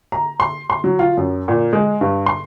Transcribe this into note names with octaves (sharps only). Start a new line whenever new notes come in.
A#5
C6
C6
F#3
F4
F#2
A#2
G#3
G2
C6